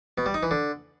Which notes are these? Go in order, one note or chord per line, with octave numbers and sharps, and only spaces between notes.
B2
G3
D#4
E3
D3